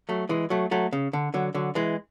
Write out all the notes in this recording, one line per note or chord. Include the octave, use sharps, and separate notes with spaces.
F#3 A3
E3 G#3
F#3 A3
F#3 A3
C#3
D3
D3 F#3
D3 F#3
E3 G#3